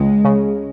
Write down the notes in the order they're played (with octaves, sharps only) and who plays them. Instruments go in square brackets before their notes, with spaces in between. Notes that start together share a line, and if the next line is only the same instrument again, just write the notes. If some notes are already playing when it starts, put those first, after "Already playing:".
Already playing: [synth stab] C#2 [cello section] G#3
[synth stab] C#3